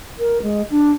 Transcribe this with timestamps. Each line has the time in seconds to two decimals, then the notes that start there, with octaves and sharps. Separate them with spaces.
0.19 A#4
0.42 G#3
0.71 D4